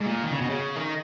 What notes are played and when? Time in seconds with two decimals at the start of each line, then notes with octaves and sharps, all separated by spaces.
0.01 G#2
0.06 A#2
0.23 D#3
0.32 C#3
0.41 B2
0.49 C#3
0.76 D#3